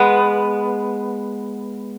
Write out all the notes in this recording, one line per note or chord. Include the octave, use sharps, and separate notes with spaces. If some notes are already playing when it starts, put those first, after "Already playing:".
Already playing: G#3 B3